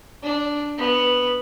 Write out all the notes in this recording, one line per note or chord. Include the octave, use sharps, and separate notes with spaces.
D4
B3